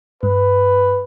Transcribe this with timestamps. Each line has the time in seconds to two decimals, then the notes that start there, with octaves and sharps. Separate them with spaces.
0.23 G2 B4